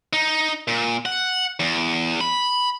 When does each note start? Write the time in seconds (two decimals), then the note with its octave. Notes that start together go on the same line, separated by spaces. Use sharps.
0.13 D#4
0.68 A#2
1.06 F#5
1.60 E2
2.21 B5